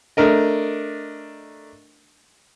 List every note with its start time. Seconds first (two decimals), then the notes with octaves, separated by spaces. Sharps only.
0.17 A3 D4 A#4 D#5